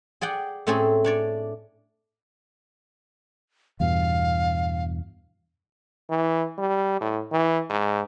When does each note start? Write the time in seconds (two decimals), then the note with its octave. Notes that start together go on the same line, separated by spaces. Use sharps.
0.21 G#4 D5 F#5 G5
0.67 A2 A3 C4 C#4 G#4 A4
1.04 D4 C#5 D5
3.80 E2 G2 B2 F5
6.10 E3
6.59 G3
7.01 A2
7.32 E3
7.70 G#2